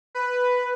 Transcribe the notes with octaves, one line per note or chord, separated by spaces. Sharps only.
B4